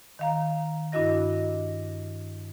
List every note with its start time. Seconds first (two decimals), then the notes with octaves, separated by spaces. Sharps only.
0.19 D#3 F5 A#5
0.92 G2 D4 E4 F#4 D#5 A#6